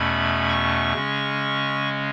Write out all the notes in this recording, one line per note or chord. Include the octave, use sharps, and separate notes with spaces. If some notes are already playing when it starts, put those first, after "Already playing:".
Already playing: E2 B2 A3 C#4 B5
C#6
C#3 G#3 C#4